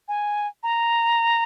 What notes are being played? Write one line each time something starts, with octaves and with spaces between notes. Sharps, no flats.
G#5
A#5